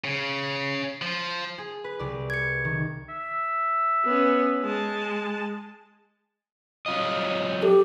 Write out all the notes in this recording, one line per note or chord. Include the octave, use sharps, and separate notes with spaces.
C#3
F3
G#4
B4
C2 D5
G#6 C#7
D#3
E5
B3 C#4
G#3 A5
F#3 F4 D#5
G4 A4